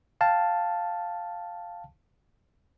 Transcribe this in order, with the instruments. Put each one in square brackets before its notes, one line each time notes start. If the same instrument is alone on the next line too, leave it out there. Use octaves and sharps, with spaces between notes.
[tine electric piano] F5 G5 A5